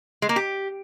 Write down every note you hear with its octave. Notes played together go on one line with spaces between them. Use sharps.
G#3
A#3
G4